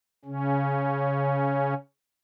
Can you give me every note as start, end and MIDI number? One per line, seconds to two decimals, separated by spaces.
0.25 1.74 49
0.25 1.74 61